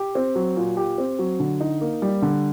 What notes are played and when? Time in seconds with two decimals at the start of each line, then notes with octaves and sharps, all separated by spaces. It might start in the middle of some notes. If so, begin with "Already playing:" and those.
Already playing: G4
0.15 C4
0.35 F#3
0.56 A#2
0.77 G4
0.98 C4
1.19 F#3
1.39 D3
1.61 D#4
1.81 A#3
2.02 G3
2.22 D3